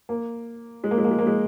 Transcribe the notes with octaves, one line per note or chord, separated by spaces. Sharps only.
A#3
G#3
A#3
G#3
A#3
G#3
A#3
G#3